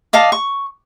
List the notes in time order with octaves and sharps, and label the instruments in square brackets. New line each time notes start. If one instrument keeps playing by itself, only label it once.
[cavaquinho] D5 D#5 F5 A5
C#6